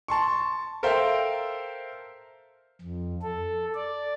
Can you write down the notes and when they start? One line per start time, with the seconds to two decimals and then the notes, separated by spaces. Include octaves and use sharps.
0.08 A5 C6 C#6
0.83 A4 A#4 C5 E5 F5 G5
2.81 F2
3.22 A4
3.75 D5